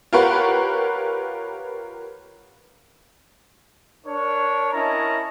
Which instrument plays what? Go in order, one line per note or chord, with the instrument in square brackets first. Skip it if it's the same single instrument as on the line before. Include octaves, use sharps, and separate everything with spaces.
[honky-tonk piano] F4 G4 A#4 B4 C#5 F#5
[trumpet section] D4 A#4 C#5
C#4 E4 A#4 D#5 A5 A#5